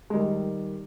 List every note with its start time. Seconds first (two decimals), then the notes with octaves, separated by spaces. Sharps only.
0.10 G#3
0.13 D#3 G3